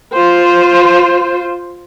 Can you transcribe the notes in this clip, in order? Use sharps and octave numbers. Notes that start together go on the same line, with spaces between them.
F4 C5